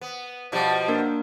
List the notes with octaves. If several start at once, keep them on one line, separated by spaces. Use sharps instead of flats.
B3
B2 F3 G3
A#3 D4 A#4